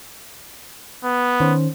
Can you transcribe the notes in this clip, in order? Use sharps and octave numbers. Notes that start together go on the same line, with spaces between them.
B3
D#3 C#4 C5